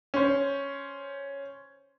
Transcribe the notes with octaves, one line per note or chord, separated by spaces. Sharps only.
C#4 C5